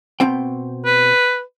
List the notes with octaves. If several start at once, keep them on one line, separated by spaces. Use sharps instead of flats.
B2 C4 G5
B4